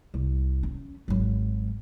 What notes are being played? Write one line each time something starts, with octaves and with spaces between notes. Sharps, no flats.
C2
C#4
G#1 F#3